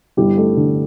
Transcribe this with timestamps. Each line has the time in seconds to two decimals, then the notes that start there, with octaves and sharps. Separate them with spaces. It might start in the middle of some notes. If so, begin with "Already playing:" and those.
0.17 G1 E4 G4
0.37 A3
0.56 D3